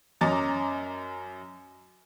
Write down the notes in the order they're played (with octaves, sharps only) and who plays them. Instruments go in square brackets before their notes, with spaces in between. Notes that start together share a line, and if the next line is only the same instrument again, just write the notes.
[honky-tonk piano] F#2 C#4 D#5 A#5 D6 A6